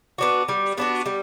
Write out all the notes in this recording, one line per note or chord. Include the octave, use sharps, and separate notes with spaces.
B3 D4 F#4
G3
B3 D4 F#4
G3